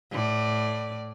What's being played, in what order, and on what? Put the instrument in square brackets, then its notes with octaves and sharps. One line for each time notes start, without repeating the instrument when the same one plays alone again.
[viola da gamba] A2 D5